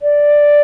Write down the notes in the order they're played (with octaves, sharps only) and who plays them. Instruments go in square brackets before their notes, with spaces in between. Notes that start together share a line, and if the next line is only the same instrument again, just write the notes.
[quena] D5